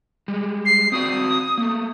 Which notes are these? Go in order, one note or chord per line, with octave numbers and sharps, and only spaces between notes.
G3 G#3
C7
C4 F#4 D5 D#6
A3 A#3